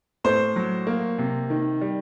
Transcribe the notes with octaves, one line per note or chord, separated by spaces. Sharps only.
A2 C5
F#3
A#3
C3
D#3
G3